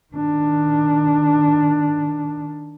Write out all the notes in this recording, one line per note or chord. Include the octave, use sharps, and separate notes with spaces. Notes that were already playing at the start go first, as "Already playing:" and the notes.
D#3 D4